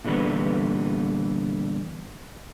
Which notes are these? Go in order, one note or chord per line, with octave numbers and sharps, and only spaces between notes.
A#2 D3 E3 G3 B3